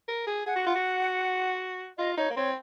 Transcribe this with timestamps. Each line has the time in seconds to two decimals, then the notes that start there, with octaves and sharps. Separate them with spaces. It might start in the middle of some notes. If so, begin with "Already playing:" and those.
0.08 A#4
0.27 G#4
0.46 G#4 F#5
0.56 F#4
0.66 F4
0.76 F#4
1.98 F4 D#5
2.17 D#4 C#5
2.30 A#3
2.36 C4 C#5